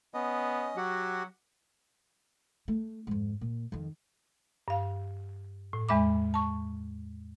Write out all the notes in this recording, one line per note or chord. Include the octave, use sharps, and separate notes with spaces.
B3 C#4 D#5
F#3 F#4 G4 F#5
A3
F2 G#2
A#2
F2 D#3
G2 F5
A2
E2 G#3 E5 B5 D6
A5 C#6